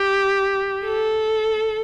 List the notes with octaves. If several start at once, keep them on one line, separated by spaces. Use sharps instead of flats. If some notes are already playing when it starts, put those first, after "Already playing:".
Already playing: G4
A4